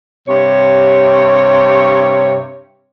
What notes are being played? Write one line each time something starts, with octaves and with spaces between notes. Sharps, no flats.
G2 C3 C#5